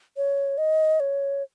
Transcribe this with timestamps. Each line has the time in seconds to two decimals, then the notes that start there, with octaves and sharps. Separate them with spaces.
0.17 C#5
0.58 D#5
1.00 C#5